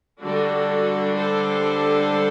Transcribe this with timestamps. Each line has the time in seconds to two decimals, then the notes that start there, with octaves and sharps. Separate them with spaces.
0.21 D3 G3 D4 F#4 A4
1.15 A4 C5